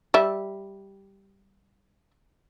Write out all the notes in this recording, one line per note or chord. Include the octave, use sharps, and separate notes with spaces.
G3 E5